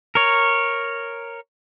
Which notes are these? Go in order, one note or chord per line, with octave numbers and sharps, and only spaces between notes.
A#4 C#5